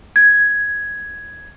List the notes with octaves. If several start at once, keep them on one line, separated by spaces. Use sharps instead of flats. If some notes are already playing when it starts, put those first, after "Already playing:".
G#6